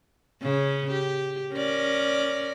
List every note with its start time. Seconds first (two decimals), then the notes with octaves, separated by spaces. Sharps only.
0.42 C#3 C#4
0.92 G4
1.53 C#4 A#4 D5